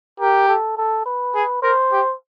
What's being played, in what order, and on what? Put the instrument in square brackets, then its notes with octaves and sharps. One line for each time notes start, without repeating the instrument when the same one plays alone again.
[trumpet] G4 [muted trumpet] A#4
[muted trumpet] A4
A4
B4
[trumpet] G#4
[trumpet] A#4 [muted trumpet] C5
[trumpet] G4